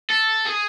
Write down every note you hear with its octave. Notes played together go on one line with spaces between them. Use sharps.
A4
G#4